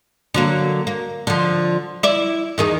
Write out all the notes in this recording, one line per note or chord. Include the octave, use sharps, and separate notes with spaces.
D3 F#3 A#3
A#3
D3 F3
E4 D5
E2 D#3 G#4